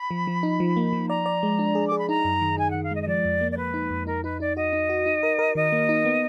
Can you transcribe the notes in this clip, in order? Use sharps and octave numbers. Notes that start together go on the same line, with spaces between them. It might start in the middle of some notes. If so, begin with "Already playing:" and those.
Already playing: B5
F3
F3
D#4
F3
A#3
F3
D5 A#5
D5
G#3
D4
G#4
G#4 D6
B5
D#4 A#5
F#2
D#3
D#4 G#5
D#3 F#5
F5
G#3 D#5
D#5
F3 D5
F2
A#3
D5
A#3 B4
D#4
F2
D#4 A#4
D#4 B4
D#4 D5
F#4 D#5
D#4
F#4
D#4
A#4
A#4
D#3 D#5
A#3
D#4
B3